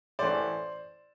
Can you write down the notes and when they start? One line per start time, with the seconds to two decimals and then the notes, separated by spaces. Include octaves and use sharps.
0.19 A1 A2 E3 A3 C#4 C5 D5